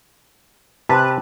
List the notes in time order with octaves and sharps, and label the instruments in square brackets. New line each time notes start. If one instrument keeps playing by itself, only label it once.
[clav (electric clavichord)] C3 [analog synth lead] B4 [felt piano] A5